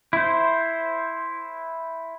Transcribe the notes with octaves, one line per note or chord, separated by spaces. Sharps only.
E4 C5